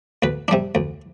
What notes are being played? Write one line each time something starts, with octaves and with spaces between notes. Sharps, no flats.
D2 B4
C3 G3 D4
D2